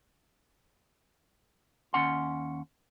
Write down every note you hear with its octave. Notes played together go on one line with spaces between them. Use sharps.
D#2 C#4 F#5 C6